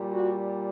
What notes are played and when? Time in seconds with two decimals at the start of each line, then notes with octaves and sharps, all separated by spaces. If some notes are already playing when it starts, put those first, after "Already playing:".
Already playing: A#2 G3
0.12 F#4